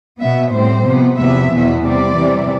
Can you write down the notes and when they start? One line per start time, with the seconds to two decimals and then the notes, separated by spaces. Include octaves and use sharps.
0.20 B2 B3 E5
0.52 A2 G3 C4 C5
0.86 C3 F3 B3
1.18 E2 C3 F3 B3 E5
1.51 E2 B2 B3
1.84 C3 G3 C4 D5
2.17 C3 E3 G3